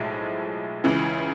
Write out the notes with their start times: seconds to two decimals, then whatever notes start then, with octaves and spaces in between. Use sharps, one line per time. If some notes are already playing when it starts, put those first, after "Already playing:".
Already playing: B1 A2 F3 G#3
0.84 C#2 C#3 E3